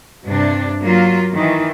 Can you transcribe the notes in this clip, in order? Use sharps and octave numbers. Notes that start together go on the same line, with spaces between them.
G2 C3 D4
F#3 A#3 F4
D#3 E3